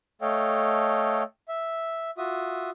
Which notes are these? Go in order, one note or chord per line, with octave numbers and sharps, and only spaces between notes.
A3 A4 C#5 D#5 F5 G5
E5
F4 F#4 E5 D#6